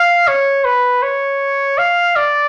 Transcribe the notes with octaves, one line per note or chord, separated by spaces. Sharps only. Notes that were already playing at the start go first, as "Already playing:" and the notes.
Already playing: F5
C#5
B4
C#5
F5
D5